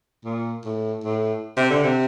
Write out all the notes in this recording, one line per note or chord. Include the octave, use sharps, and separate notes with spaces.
A#2
A2
A2
C3
D3
C3